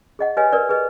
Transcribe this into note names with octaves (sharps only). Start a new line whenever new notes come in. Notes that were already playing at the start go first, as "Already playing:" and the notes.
G#4 D#5 F#5
G4 B4 C#5 D#5 F5 G#5
A#4 B4 D5
G#4 B4 D#5